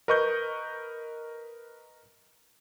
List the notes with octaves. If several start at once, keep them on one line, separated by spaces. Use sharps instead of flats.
A#4 B4 D#5 C#6 F#6 G6